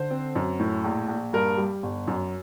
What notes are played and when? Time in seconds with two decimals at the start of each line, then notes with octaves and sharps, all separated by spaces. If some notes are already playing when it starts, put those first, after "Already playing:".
Already playing: D3 C5
0.10 C4
0.35 F#2
0.59 A2
0.84 A#1
1.08 A#1
1.33 G2 A#4
1.57 G3
1.83 G1
2.08 F#2